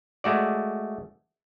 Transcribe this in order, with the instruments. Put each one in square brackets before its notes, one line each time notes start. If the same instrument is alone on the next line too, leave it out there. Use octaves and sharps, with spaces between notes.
[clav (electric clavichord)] G#3 A3 F#4 D5